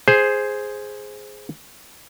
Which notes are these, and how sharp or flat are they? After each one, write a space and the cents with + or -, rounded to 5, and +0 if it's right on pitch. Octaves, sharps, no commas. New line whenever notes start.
G#4 +0 C5 +0